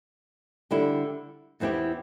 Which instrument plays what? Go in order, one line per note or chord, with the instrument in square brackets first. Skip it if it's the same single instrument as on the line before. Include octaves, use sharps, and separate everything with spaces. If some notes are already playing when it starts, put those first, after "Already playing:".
[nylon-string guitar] D3 G3 E4 G4
E2 E3 C4 E4 G4